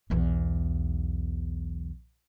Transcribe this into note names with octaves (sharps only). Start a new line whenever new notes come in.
B1 E2